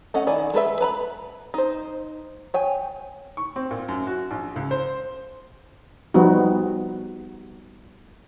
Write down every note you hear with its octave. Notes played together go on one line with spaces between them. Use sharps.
A3 C#4 D#5 F#5
D#3 E4 D5 G#5
G#3 A4 B4 E5
B4 A#5 B5
D#4 C5
C#5 G5 G#5
C#6
C4
A#2
F#2
F#4
A#1
C#2
C5
F3 G3 B3 D#4 F#4